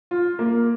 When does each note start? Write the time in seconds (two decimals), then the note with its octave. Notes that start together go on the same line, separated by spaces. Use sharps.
0.11 F4
0.39 A#3